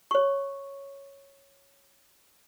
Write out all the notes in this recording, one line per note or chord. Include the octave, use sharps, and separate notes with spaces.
C#5 C#6